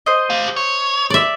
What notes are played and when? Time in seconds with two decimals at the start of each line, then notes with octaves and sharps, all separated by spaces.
0.06 C5 D#5
0.30 G4 F5
0.56 C#5
1.10 D5 E5